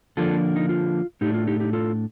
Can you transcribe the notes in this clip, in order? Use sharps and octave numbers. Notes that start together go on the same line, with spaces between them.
D3 F3 A#3 D4 F4 A4
D#4
F4
A2 A3 D4 D#4 G4
F4
D#4 G4
D#4 G4
F4 A4